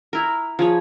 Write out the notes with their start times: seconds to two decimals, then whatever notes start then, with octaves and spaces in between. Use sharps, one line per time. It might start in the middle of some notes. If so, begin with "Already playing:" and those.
0.13 E4 A#4
0.59 F3 G#4 C#5